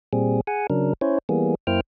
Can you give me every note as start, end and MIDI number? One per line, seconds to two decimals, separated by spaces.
0.13 0.41 46
0.13 0.41 55
0.13 0.41 60
0.13 0.41 68
0.47 0.67 68
0.47 0.67 78
0.47 0.67 80
0.70 0.93 49
0.70 0.93 54
0.70 0.93 62
0.70 0.93 70
1.01 1.18 61
1.01 1.18 64
1.01 1.18 72
1.01 1.18 73
1.29 1.55 52
1.29 1.55 55
1.29 1.55 58
1.29 1.55 59
1.29 1.55 68
1.67 1.81 42
1.67 1.81 58
1.67 1.81 64
1.67 1.81 72
1.67 1.81 79
1.67 1.81 89